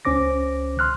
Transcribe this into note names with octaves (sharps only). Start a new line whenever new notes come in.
C#2 C#4 C5 D6 A#6
C6 F6 F#6